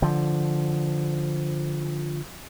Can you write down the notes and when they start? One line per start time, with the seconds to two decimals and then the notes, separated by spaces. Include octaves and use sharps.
0.02 D3 F3